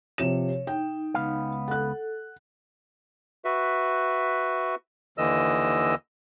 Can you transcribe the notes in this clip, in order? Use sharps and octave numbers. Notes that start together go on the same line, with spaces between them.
C3 F3 C#5 E7
D#4 G5
C#2 B3 F5
A4 F#5 F#6
F#4 B4 E5
D#2 D3 E3 D#5 E6